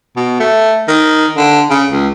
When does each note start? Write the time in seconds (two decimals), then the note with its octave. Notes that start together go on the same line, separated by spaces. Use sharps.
0.16 B2
0.40 A3
0.88 D#3
1.37 D3
1.70 C#3
1.91 C#2